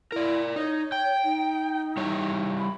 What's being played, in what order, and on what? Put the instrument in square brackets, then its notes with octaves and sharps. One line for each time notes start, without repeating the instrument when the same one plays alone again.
[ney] E4 [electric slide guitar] A#4 D5
[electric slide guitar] D#4 [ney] C#5
[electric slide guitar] G5
[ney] D#4
[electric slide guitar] G3 E4 C#5
[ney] B5